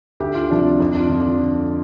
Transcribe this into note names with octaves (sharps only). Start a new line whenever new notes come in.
D2 G4
F4
C3 F3 D4
F2 D4
F4
D3 F3
D4